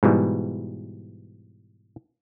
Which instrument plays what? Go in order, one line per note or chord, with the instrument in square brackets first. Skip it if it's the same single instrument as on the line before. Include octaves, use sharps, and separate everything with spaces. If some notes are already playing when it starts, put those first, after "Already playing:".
[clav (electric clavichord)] G#2 B2 E3 G3